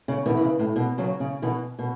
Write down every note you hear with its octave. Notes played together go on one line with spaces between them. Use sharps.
C#3
B2 E3
E3
C#3
A2
B2
C#3 F#3
C#3
B2 E3
B2